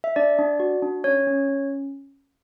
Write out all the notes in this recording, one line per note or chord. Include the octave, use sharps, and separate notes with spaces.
E5
D4 D5
D4
F#4
D4
C#4 C#5
C#4
C#4